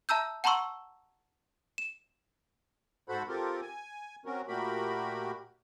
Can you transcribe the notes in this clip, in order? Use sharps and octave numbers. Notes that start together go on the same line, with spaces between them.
E5 A5 A#5 E6 G6
F#5 A5 A#5 C6 C#6 E6
E7
G#2 F#4 A4 C5 F#5 B5
C4 F4 G4 A4 A#4
G#5
F#3 C4 C#4 F#4 A#4
A#2 A3 F#4 G4 A#4 B5